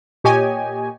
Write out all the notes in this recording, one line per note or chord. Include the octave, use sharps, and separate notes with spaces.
A#2 G4 C#5 D#5 G#5